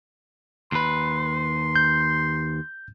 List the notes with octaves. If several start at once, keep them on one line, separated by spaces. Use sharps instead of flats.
D#2 B4 C6
G6